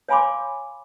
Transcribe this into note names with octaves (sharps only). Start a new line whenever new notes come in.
C#5 F5 G#5 B5 C6 D6